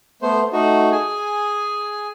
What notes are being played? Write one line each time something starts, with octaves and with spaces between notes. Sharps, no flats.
A3 B3 C5
A3 D#4 F#4
G#4 G#5